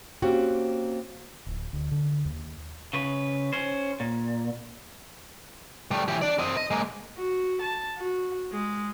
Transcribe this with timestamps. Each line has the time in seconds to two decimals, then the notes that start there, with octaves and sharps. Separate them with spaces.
0.22 A#3 C4 C#4 F#4 G4
1.46 D1
1.73 D2
1.91 D3
2.25 D#2
2.93 C#3 B4
3.53 C#4 C5
4.00 A#2
5.91 G3 A3
6.08 E3 G4
6.22 D4 D5
6.39 C4 D#5
6.57 D#5
6.71 G#3 A#3
7.17 F#4
7.62 A5
7.97 F#4
8.52 G#3